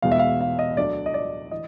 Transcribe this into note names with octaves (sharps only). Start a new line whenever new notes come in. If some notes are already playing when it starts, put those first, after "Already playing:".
E2 B2 G#3 F5
E5
F5
F5
D#5
D2 D3 F#3 A3 D4 D5
D#5
D5
E3 D#5